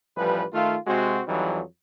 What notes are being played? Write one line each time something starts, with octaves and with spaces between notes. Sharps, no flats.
A1 F3 G3 B4
D#3 A3 F4
C3 G#3 C4 F#4
F2 E3 F#3 G3 D#4